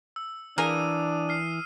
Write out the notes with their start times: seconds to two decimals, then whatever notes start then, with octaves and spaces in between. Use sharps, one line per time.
0.16 E6
0.58 E3 A#3 D4 G#4 A#4 D#6 D#7
1.29 F6 C7